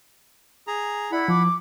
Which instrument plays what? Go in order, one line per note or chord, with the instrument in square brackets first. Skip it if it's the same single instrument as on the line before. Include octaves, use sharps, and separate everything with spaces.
[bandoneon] G#4 A#5
[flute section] E4 D5 [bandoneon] F#5 B5
[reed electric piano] F3 [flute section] D6